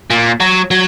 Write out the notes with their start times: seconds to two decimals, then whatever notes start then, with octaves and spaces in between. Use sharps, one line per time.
0.10 A#2
0.40 F#3
0.71 F#3